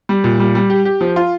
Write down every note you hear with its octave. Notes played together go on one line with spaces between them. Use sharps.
G3
A#2
G3
G3
G4
G4
F3
F4